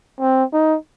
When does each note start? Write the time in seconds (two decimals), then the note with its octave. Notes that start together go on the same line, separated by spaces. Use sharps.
0.21 C4
0.53 D#4